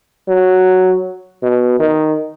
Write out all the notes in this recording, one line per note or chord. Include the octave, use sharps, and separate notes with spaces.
F#3
B2
D#3